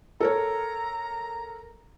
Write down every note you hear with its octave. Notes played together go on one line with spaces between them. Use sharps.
A4 A#4 C#5 A#5